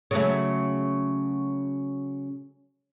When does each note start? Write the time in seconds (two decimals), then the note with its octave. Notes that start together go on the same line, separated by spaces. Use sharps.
0.11 C#3 F#3 A3